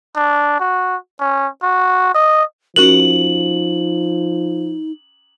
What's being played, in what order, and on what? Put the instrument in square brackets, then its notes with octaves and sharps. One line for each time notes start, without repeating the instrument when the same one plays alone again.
[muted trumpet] D4
F#4
C#4
F#4
D#5
[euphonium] F3 [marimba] C#4 F#4 A#4 [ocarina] D#4 [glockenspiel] F#7